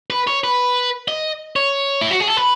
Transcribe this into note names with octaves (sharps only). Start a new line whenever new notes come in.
B4
C#5
B4
D#5
C#5
E4
F#4
G#4
A4
B4